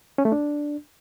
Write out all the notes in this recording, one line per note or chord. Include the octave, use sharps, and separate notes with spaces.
C#4
A3
D4